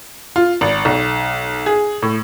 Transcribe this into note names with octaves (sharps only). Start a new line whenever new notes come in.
F4
G#1
B1
G#4
A2